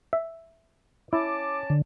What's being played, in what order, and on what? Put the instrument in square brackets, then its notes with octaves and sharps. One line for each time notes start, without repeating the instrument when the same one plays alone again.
[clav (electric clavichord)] E5
[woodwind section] C#4 A5 D6 [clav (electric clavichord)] E4
[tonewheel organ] D3